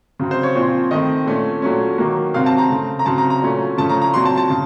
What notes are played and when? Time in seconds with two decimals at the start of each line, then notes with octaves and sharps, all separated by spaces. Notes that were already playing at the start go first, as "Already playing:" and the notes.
0.20 C#3 F#3 C4
0.31 C5
0.43 C#5
0.55 A#2 F3 C4
0.91 D#3 A3 C4 D#5
1.26 A#2 A3 C#4
1.62 A#2 F#3 A3 C#4
1.98 D#3 F#3 A#3
2.34 C3 F#3 C4 F5
2.46 A5
2.58 A#5
2.70 C#3 A3 C4
2.99 A#5
3.06 C#3 F#3 C4 A5
3.18 A#5
3.30 A#5
3.42 A#2 F#3 A3 C#4
3.78 C#3 F3 A3 C#4 A5
3.90 A#5
4.02 A#5
4.14 A#2 F#3 C4 C6
4.25 A5
4.37 A5
4.50 C#3